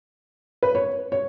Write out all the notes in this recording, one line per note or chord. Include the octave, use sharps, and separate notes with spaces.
B4
C#5
C#5